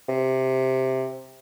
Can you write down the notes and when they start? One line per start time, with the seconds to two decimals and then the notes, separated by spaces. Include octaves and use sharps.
0.09 C3